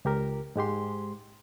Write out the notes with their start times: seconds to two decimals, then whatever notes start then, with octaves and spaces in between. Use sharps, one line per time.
0.05 C#2 G4 A#4
0.56 G#2 G#3 G4 C6